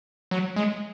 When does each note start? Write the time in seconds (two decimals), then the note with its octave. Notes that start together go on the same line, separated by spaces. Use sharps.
0.31 F#3
0.56 G#3